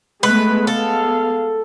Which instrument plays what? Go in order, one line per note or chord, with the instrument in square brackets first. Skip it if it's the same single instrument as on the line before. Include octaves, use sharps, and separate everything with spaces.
[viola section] G#3 A3 B3 [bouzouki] B4
[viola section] G#3 B3 F5 [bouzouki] A4